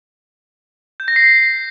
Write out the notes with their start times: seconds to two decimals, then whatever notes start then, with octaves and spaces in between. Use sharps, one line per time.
1.00 G6
1.08 A#6
1.16 C7